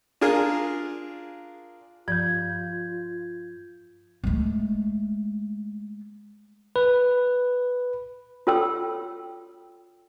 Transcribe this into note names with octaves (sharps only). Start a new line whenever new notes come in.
D4 F4 G#4 A#4
G2 F3 F4 D5 G6 G#6
G#3 A3
B4
F4 A4 C#5 G5 E6